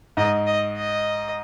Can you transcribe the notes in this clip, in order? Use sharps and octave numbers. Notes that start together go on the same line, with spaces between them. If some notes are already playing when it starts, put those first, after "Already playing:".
G#2 D#5
D#5
D#5